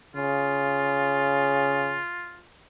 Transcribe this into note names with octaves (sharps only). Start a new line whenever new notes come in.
C#3 F4